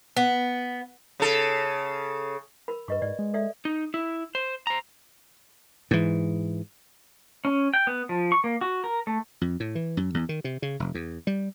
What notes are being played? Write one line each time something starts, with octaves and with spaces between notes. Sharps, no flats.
B3
C#3 A4
A#4 B5
G2 B4 D#5 C#6
G#2 D5
G#3
A4 D5 E5
D#4
E4
C5
C5 A#5
G#2 E3
C#4
G5
B3
F3
C#6
A#3
F#4
A#4
A3
F2
A2
E3
F#2
E2
D#3
C3
C#3
F1
E2
G3